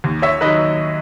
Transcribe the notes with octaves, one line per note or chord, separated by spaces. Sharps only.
D#2
C#5 E5
D#3 F#3 B4 D#5